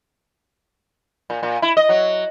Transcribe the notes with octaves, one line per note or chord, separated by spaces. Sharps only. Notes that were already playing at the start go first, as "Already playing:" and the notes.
A#2
A#2
E4
D#5
F#3